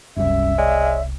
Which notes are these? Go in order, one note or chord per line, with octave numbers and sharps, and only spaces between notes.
E1 C2 F#2 G3 C#4 E5
G#3 C#5 D5